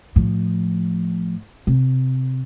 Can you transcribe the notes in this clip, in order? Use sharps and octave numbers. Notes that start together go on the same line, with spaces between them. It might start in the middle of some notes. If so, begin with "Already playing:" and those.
A2 F3
C3